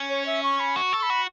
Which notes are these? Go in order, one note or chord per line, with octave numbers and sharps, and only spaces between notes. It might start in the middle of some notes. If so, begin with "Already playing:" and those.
Already playing: C#4
C#5
E5
C#6
B5
F#4 C#6
A4
C#6
B5
F#4